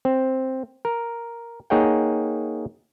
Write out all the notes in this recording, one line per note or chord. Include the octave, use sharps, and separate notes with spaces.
C4
A#4
A#3 D#4 G#4 C#5 F#5 G5